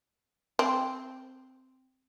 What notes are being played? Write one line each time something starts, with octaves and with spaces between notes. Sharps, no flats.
C4